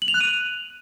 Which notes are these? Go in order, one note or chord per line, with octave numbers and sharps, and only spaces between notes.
F#7
F7
F#6
D#7